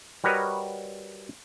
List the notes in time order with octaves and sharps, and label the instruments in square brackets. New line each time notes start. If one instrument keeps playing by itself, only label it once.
[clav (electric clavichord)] G3 F#4 A#4 B4 C#5 D#5